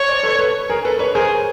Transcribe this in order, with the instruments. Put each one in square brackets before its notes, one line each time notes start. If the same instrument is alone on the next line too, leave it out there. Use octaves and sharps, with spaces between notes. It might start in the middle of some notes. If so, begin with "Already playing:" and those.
Already playing: [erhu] C#5
[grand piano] C5 D5
A4 B4
A4 B4
G#4 A#4
A4 B4
B4 C#5
[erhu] G#4 [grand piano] A#4 C5